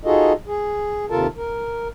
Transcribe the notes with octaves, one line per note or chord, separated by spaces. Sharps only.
D#4 F4 F#4 G#4 A4 D#5
G#4
D#2 C3 F4 A4 A#4 A5
A#4